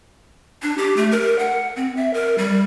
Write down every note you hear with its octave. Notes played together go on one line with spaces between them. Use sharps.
D4
G4
A3
A#4
F#5
C4
E5
A#4
G3